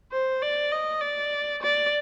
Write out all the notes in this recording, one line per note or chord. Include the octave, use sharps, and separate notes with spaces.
C5
D5
D#5
D5
D5